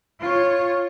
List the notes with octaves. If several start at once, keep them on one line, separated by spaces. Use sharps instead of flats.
F4 C#5